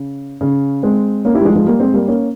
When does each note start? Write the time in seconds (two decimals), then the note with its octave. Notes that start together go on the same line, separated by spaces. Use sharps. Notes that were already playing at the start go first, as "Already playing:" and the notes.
Already playing: C#3
0.41 C#3
0.83 G#3 C4
1.25 A#3 C#4
1.35 E4 G4
1.41 G3
1.45 F3 G#3
1.56 F3 G#3
1.66 G3 A#3
1.80 G#3 C4
1.94 G3 A#3
2.08 A#3 C#4